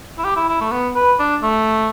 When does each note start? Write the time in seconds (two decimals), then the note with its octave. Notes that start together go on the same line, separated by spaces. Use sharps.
0.18 E4
0.25 G4
0.36 E4
0.49 E4
0.61 A3
0.72 B3
0.96 B4
1.19 D4
1.43 A3